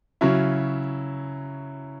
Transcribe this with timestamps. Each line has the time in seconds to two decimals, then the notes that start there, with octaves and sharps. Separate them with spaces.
0.21 C#3 F#3 C#4 E4